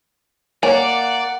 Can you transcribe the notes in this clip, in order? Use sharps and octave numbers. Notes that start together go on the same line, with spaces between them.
A#3 C#5 D5 F#5 G#5